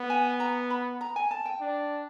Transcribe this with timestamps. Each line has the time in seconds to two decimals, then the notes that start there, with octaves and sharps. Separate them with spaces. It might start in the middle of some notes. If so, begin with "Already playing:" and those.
Already playing: B3
0.10 G#5
0.40 A#5
0.70 B5
1.01 A#5
1.16 G#5
1.31 A5
1.45 G5
1.61 D4